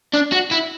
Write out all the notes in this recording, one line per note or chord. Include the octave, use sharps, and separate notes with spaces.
D4
F#4
E4